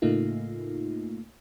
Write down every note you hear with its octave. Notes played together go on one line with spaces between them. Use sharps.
A2 C#3 A3 A#3 D#4 F4